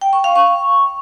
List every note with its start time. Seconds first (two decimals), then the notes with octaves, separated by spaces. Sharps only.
0.01 G5
0.13 C#6
0.24 F5
0.35 C#6